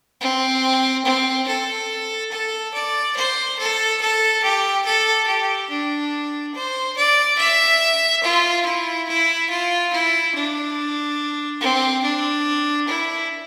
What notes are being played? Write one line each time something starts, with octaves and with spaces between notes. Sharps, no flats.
C4
C4
A4
A4
D5
C5
A4
A4
G4
A4
G4
D4
C5
D5
E5
F4
E4
E4
F4
E4
D4
C4
D4
E4